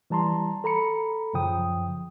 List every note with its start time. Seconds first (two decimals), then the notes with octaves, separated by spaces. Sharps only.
0.10 E3 G3 A5 A#5 C6
0.64 A4 A#5 B5 C#7
1.33 F#2 C#3 F3 G5 D#6